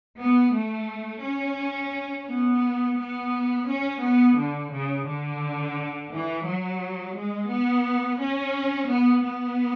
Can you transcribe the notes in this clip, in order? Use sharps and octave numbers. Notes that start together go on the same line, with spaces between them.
B3
A3
C#4
B3
B3
C#4
B3
D3
C#3
D3
E3
F#3
G#3
B3
C#4
B3
B3